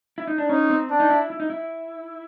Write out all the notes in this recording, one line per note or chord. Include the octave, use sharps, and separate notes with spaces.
E4
D#4
D4
C#4 D#4
C4
D4
D#4
E4
E4
D#4
E4